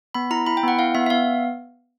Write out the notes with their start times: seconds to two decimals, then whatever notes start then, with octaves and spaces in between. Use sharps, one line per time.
0.14 B3 B5
0.31 E4 A#5
0.46 E4 B5
0.57 G5
0.63 B3 F#5
0.79 E4 F5
0.95 B3 E5
1.06 E5
1.10 B3 F5